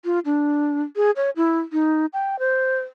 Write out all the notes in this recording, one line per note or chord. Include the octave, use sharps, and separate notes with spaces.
F4
D4
G#4
C#5
E4
D#4
G5
C5